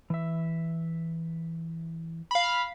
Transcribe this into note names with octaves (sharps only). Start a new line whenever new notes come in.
E3 E5
F5 B5